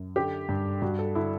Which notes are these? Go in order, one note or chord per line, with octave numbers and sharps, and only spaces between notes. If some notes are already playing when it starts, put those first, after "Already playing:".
Already playing: F#2
D3 G4
G2
G2 F#4
A4
D3 E4